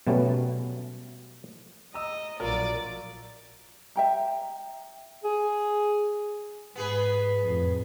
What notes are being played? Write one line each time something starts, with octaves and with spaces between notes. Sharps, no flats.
B2 F#3 G3 A3 B3 C#4
D#5 A#5 D#6 E6
A#1 F#3 F4 A#4 D5
E5 G5 A#5
G#4
G#2 B3 G#4 B4
F2 A2